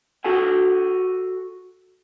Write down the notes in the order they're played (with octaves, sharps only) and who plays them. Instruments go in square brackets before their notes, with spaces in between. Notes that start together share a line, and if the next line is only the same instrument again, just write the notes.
[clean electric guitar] F#4 A4 F#5 G#5